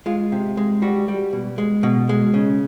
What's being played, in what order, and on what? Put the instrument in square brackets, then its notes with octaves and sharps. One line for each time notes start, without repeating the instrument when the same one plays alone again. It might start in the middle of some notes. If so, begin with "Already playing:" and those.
[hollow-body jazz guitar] G#3 F4
C3
G#3
G3 F#4
G3
B2
G#3
B2
G#3
C#3